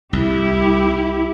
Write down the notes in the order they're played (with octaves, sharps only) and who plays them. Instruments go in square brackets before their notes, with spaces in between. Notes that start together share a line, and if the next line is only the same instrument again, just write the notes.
[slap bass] C2 [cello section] E4 G4